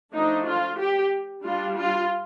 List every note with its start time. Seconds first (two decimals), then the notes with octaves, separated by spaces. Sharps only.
0.12 F3 A3 D4 D#4
0.46 F4
0.78 G4
1.44 G3 D4 F4
1.77 F4